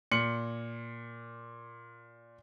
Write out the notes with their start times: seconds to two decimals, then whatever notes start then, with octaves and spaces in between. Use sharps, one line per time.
0.11 A#2 C#7 F#7